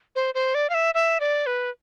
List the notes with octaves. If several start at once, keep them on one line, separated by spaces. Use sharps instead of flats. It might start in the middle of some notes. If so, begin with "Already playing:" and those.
C5
C5
D5
F5
E5
E5
D5
B4